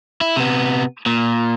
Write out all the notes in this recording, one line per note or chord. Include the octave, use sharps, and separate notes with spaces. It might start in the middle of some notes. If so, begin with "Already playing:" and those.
E4
C3 B3
A#2